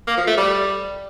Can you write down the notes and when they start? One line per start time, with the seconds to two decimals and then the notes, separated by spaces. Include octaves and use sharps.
0.07 A#3
0.17 F3
0.28 A3
0.38 G3